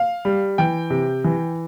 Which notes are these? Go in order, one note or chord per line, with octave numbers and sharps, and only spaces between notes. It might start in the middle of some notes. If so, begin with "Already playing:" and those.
Already playing: F5
G3
E3 G5
C3
E3